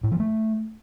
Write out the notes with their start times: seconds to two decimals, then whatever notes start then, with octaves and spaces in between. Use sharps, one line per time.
0.04 A2
0.12 F3
0.20 A3